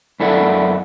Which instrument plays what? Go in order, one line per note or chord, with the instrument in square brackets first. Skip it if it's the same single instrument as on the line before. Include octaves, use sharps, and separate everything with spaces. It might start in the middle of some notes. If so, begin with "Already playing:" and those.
[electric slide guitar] F#2 E4 A4 D5 F#5